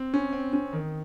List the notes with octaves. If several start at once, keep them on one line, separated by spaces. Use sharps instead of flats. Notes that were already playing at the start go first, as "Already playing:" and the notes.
Already playing: C4
C#4
C4
C#4
D#3